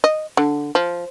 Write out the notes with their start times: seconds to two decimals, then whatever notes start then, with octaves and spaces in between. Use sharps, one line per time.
0.04 D#5
0.37 D3
0.75 F3